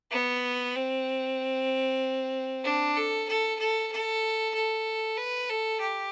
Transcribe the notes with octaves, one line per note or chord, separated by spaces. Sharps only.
B3
C4
D4
A4
A4
A4
A4
A4
B4
A4
G4